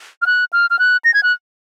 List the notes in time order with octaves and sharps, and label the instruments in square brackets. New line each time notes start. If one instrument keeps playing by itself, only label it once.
[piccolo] F6
F#6
F6
F6
F#6
A#6
G#6
F#6